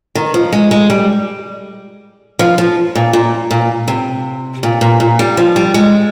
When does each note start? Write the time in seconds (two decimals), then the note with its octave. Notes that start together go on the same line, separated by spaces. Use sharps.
0.15 D#3
0.34 F3
0.53 G#3
0.71 G#3
0.90 G3
2.39 F3
2.58 F3
2.95 A#2
3.13 A#2
3.51 A#2
3.88 C3
4.63 A#2
4.81 A#2
5.00 A#2
5.19 G3
5.37 F3
5.56 G3
5.74 G#3